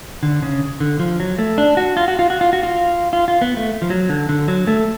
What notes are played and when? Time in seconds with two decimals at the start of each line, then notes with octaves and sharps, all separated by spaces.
0.23 D3
0.42 C#3
0.80 D3
1.00 F3
1.20 F#3
1.39 A3
1.58 D4
1.77 F#4
1.97 F4
2.08 F#4
2.19 F4
2.30 F#4
2.41 F4
2.53 F#4
2.63 F4
3.13 F4
3.28 F4
3.42 B3
3.57 A3
3.82 F3
3.90 F#3
4.09 D3
4.29 D3
4.48 F#3
4.67 A3